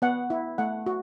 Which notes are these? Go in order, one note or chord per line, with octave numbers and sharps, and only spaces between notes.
B3 F#5
E4
A3 F#5
F#4